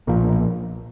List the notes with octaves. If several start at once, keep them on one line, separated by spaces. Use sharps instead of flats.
B1 A#2 F3 A#3